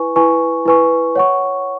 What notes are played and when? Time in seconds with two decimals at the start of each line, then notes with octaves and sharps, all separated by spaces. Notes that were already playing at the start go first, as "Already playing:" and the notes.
Already playing: E4 B4 G#5 C#6
0.16 E4 B4 G#5 C#6
0.66 E4 B4 G#5 C#6
1.15 C#5 F#5 C#6